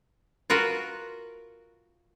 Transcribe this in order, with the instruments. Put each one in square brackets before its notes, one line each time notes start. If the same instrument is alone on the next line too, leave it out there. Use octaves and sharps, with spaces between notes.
[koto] F4 F#4 A#4 B4